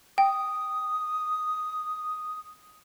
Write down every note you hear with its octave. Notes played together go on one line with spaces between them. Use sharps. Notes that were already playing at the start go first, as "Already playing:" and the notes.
G5 D#6